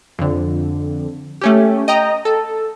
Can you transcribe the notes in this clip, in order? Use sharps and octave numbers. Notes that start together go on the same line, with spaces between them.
F2 D3
A3 C#4 G4
D#5 G5 A#5
A4